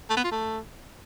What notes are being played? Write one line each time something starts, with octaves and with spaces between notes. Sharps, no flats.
A3
B3
F4
A3